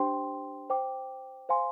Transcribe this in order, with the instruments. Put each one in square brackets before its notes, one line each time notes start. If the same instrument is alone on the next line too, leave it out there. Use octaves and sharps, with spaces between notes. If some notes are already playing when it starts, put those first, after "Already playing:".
Already playing: [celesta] D4 G4 C5 G5 C6
C5 G5 D6
C5 F5 G#5 C6